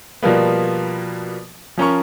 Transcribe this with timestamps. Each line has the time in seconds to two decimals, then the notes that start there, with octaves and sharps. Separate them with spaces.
0.23 B2 F3 G3 A#3 B3
1.77 F3 C#4 A#4 C#6